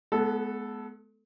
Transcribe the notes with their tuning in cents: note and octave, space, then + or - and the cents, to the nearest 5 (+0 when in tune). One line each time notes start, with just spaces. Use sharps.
G#3 +40 B3 +0 A4 +0